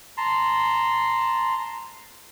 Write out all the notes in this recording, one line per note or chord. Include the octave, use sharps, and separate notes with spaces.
A5 A#5 C6